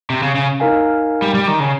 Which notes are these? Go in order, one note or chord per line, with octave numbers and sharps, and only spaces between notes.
C3
C#3
C#3
D#4 A#4 F5 G#5
G3
G3
D#3
C#3